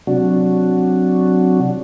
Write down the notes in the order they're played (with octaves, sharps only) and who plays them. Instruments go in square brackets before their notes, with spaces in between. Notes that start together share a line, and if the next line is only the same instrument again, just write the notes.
[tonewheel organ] C3 F#3 D4 F#4